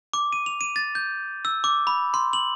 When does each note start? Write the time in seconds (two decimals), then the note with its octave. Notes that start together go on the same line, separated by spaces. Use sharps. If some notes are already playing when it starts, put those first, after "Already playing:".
0.13 D6
0.33 D#7
0.46 F7
0.61 D#7
0.76 A6
0.95 G6
1.45 E6
1.64 D6
1.87 B5
2.14 C6
2.33 F#7